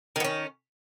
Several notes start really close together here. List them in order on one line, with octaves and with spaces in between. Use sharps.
D#3 B3 C#4